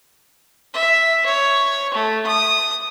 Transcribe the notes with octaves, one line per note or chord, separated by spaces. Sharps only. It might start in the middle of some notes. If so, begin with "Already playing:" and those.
E5
C#5
A3
D#6